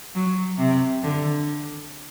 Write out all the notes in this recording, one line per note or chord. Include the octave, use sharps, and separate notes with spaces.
F#3
C3
D3